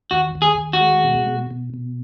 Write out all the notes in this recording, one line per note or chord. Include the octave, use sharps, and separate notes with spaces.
D#2 F#4
D#2
G#4
D#2
F#4
G#3
B2
B2
B2
B2